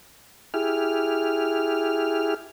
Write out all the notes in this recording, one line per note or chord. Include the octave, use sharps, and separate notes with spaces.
E4 G4 G#4 F6